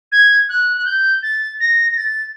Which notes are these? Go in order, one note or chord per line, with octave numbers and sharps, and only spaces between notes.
G#6
F#6
F#6
G6
A6
A#6
A#6
A6